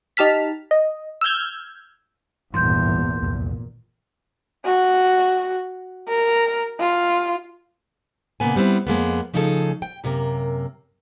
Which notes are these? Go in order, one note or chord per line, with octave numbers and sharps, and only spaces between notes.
D#4 G4 A5 F6 B6
D#5
E6 F6 G6 G#6
G#1 E2 G2 A#2 E3 C6 G6
C2 F2
F#4
A#4
F4
A#2 C#3 A#3 B3 G#5
G3 B3 C4 E4
F2 G#3 A#3 B3
C#3 F3 A3 D#4 G#4 A4
G5
F#2 C3 A#3 A#4